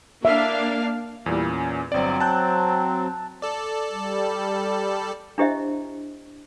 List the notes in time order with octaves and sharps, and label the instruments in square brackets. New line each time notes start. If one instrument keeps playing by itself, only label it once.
[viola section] A#3 D4 F5 [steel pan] E5
[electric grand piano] E2 A#2 [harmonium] E3 G3
[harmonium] C#4
[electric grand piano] G1 D5 [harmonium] F#3 C4
[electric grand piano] A5 F#6 G6
[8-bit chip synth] A4 D5
[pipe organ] G3
[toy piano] D4 E4 G4 C5 D#5 E5